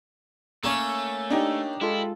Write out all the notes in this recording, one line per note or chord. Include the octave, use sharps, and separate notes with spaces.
A3 A#3 C#4
D4 D#4 G4
G#3 E4 F4 A4